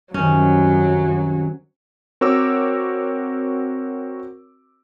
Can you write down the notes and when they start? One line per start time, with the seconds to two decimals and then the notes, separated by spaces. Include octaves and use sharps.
0.14 C2 F#2 D#3 F#3 C#4
2.21 C4 F#4 A#4 C#5 D6 E6